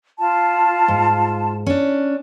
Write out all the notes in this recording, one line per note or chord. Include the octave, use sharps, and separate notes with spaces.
F4 A5
G#2
C#4 D4